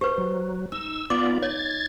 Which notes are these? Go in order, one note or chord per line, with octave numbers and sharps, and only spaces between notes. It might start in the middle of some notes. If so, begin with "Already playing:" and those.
G4 B4 C5
F#3
D#4 E6
B3 D#4 F4 D5 D6
C#5 G#6 A6